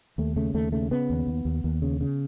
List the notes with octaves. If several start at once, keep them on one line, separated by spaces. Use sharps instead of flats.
D#2 A3
C#3 A3
D#2 A3
C#3 A3
C#3 B3
D#2
D#2
D#2
D#2
C#3
C#3